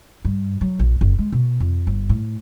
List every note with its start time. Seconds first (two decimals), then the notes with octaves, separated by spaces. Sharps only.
0.25 G2
0.61 F#3
0.79 A#1
1.01 F#1
1.18 G#3
1.32 B2
1.60 F2
1.87 G1
2.09 A2